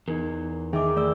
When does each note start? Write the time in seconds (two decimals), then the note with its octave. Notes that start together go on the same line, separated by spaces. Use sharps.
0.08 E2 D#4 A#4
0.73 D#3 G#4 E5 D6
0.96 A3 D5 E6